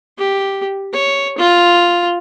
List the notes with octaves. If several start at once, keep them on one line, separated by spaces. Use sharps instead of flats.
G4
C#5
F4